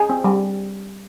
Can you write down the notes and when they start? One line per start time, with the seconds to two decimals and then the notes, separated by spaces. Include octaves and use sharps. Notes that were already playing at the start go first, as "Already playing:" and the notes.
Already playing: G#4
0.10 C4
0.24 G3